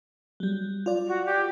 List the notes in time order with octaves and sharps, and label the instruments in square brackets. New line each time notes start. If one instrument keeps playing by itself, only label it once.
[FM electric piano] F#3 G3
F4 D5
[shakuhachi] F#4
G4